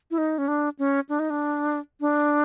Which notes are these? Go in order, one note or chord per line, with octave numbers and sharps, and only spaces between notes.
E4
D#4
C#4
D4
C#4
D4
D#4
D4
D4